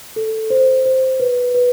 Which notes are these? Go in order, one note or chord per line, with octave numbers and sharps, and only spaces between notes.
A4
C5
C5
B4
B4